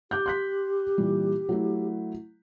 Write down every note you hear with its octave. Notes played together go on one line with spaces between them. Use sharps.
G4 D6 F#6 G6
C6 F#6 B6
A#2 E3 G3
F#3 A3 E4